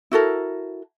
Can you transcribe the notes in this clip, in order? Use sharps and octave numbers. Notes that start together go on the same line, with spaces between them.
E4 F#4 A4 A#4